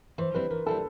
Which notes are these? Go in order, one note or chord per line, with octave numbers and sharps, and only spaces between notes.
E3 C5
G3 C4 E4 B4
E3 A#4
G3 C4 E4 A4